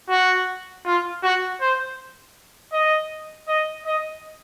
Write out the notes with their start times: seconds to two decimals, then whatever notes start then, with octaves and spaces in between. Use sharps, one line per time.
0.10 F#4
0.86 F4
1.23 F#4
1.61 C5
2.73 D#5
3.48 D#5
3.86 D#5